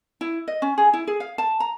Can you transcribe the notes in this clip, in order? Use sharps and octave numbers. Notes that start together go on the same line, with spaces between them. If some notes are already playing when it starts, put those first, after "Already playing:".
E4
D#5
C#4
G#4
E4
G#4
F5
A5
A#5